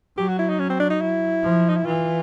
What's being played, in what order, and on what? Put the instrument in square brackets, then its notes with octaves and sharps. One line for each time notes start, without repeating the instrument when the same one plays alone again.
[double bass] F#3 [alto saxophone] G4
[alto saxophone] F#4
E4
D#4
C#4
C4
D4
D#4
E4
[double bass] F3
[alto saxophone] D#4
E4
[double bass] E3 [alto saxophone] F4